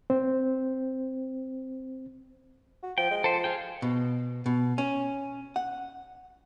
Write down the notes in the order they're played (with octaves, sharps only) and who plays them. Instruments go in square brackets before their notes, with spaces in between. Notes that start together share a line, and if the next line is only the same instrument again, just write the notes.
[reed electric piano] C4 C5
[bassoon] F#4
[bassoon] F3 [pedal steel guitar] G5
[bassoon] G#3
[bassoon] F3 [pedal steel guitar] A4 C5
[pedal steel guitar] F4 G#4 G5
[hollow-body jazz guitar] B2
B2
C#4
F#5